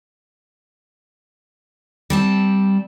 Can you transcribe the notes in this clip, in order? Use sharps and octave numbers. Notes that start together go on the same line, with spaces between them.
G3 C4 A5